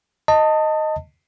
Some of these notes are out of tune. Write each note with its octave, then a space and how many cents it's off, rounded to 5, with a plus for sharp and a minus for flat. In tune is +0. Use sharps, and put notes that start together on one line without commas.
D#5 +0 A5 +25